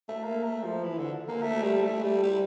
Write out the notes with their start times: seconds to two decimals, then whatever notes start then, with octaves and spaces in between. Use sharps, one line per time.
0.09 A3
0.23 A#3
0.43 A3
0.63 F3
0.84 E3
0.98 D3
1.28 A#3
1.43 A3
1.63 G3
1.83 A3
2.03 G3
2.23 G3